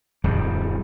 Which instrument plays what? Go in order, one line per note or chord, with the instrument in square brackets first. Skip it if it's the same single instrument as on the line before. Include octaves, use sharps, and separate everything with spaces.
[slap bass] D1 F2 G3